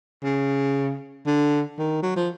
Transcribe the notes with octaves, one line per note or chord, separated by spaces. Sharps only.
C#3
D3
D#3
F#3
F3